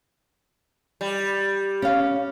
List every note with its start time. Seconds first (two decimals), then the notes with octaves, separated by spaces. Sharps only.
1.01 G3
1.82 C#4 F5